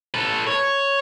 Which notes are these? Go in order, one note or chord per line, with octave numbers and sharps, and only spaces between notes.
A4 B4
C#5